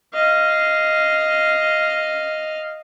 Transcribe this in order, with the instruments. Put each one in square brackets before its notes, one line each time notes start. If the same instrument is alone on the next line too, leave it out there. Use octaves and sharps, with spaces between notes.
[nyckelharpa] D#5 F5